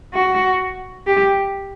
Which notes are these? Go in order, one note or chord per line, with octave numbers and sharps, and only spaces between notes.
F#4
G4